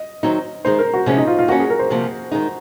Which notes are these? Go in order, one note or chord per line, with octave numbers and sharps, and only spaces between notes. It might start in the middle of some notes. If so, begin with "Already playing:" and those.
Already playing: D#5
D#3 F#3 C4 D#4
D#3 G#3 D#4 C5
A#4
F#4
C3 F3 G#3 C#4
D#4
F4
F4
F3 A#3 C#4 F#4
G#4
A#4
C5
C3 F3 A#3
D#3 G#3 D#4